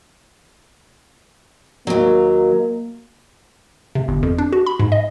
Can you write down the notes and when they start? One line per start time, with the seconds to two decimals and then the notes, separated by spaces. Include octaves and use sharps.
1.87 D#2 F#3 A#3
3.95 C3
4.08 G1
4.23 F2
4.38 D4
4.52 F#4
4.66 B5
4.80 G#2
4.92 D#5